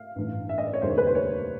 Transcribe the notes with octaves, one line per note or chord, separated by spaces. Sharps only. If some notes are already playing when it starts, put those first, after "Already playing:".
Already playing: F5
A1 G2 E3
E5
D#5
D5
C#5
F1 D#2 D3 G3 A#3 C5
C#5
B4
C5
C#5